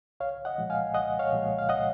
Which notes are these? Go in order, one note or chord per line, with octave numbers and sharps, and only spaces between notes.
C2 C#5 F5
D#5 F#5
A#2 F3 G#3
F5 G#5
C2 D#5 F#5
C#5 F5
A#2 F3 G#3
F5
C2 D#5 F#5